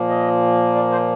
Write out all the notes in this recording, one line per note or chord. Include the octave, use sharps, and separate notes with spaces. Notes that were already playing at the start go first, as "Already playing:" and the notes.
Already playing: A#2 F3 A#3
D#5
D5
C5